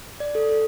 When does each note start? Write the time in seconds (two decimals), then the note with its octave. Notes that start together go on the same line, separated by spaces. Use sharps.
0.20 D5
0.35 A4
0.49 A4